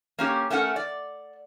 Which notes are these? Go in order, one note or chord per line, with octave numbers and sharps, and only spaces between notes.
A#3 C#4 G4
A3 C#4 A#4 F#5
D5